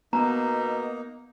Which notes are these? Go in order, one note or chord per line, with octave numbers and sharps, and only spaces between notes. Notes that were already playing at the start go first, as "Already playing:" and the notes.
B2 A#3 B3 D#4 A#5